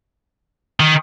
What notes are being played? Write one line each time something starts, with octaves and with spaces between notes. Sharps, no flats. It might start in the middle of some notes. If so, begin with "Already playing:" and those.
D#3